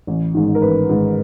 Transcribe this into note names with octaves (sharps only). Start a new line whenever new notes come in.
A1
G#2 D#3
A#4
A1 B4
G#2 D#3